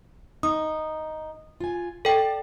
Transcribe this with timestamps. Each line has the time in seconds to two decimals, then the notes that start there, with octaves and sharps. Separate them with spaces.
0.43 D#4 D#6
1.60 F4 G#5
2.05 A4 D5 G5 A5